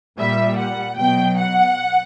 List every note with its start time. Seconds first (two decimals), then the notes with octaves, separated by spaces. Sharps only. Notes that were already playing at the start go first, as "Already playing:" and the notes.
0.19 A#2 G3 E5
0.58 F#5
0.96 B2 F#3 G5
1.36 F#5